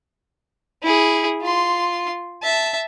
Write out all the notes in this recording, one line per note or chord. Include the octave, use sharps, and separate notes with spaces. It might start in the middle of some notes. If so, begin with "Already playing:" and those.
E4 G#4
F4 C6
E5 A5